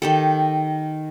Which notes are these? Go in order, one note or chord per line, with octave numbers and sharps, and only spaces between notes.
D#3 G4 A4